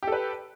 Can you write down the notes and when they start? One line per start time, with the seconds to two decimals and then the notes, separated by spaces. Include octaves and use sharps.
0.03 G4
0.07 A4
0.12 B4